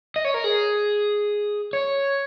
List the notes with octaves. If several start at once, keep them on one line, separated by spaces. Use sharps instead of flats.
D#5
C#5
A#4
G#4
C#5